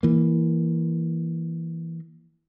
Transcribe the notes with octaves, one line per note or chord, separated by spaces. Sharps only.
E3 A#3